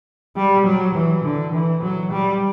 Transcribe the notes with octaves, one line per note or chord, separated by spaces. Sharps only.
G3
F#3
E3
D3
E3
F#3
G3